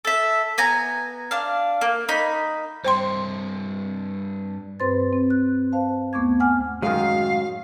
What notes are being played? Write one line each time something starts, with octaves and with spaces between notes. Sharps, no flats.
A4 E5
B3 G#5 A#5
D4 F5
A#3
D#4 B5
G2 C5 C#5 G5 C6
G2 C4 B4 C5 C6 A6
C4
F#6
C5 F5 A5
D#2 A3 B3 C#6 D6 G#6
F#5 G#5 D6 F6
F#2 A2 D#3 G#3 F#4 G#4 F5